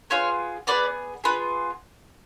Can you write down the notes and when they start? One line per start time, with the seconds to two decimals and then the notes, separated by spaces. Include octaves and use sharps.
0.10 B3 F4 G#4 C#5 F5
0.67 B3 F4 G#4 B4 D5
1.24 B3 F4 G#4 B4